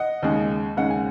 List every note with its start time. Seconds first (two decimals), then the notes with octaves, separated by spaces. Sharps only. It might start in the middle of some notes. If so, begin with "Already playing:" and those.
Already playing: D#5 F#5
0.22 D#2 C#3 G#3
0.77 D#2 C#3 G#3 F#5
0.90 G#5